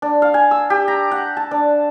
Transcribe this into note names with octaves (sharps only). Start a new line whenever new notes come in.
D4
F5
G#5
E6
G4
A#5
F#5
A5
D4